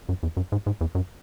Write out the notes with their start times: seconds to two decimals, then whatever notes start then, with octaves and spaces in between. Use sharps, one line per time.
0.09 F#2
0.23 E2
0.37 F#2
0.52 G#2
0.66 G#2
0.81 E2
0.95 F#2